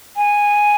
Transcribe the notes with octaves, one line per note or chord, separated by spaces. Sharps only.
G#5